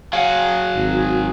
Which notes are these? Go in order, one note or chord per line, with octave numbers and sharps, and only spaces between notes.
F#3 G#4 F5 F#5
G#1